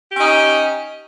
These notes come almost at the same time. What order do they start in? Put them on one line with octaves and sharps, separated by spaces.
G4 C#4 D#4